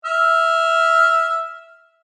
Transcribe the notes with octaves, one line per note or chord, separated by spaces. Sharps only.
E5 F6